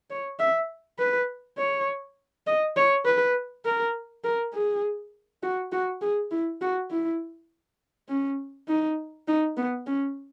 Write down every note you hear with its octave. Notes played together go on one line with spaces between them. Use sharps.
C#5
E5
B4
C#5
D#5
C#5
B4
A#4
A#4
G#4
F#4
F#4
G#4
E4
F#4
E4
C#4
D#4
D#4
B3
C#4